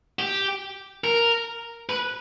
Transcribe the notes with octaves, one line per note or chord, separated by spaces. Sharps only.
G4
A#4
B4